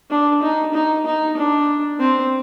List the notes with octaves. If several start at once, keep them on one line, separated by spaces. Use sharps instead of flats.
D4
D#4
D#4
D#4
D4
C4